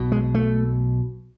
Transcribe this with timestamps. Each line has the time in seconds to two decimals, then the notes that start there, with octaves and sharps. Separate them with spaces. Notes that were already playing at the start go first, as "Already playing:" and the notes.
Already playing: B1 B2
0.12 G#3
0.35 A3